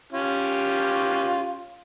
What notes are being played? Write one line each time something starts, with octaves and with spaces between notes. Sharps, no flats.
C#4 F4 G4